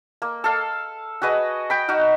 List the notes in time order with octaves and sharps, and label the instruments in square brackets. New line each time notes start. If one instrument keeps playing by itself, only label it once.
[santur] A#3
A4 F5
F#4 G#4 B4 D#5
G5 B5
D#4 F#4 F5